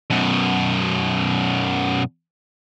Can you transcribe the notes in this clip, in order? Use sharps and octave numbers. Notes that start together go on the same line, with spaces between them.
F#2 B2